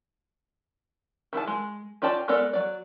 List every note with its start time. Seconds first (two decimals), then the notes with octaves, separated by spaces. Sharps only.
1.33 D#3 E4 G#4 A5
1.47 G#3
2.02 C#4 F4 D5 G5 A5
2.28 G#3 B3 A4 A#4 D5
2.53 F#3 D5